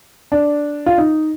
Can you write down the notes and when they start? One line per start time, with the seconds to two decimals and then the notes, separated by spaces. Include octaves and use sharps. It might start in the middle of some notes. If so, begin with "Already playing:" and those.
0.32 D4
0.86 F4
0.98 D#4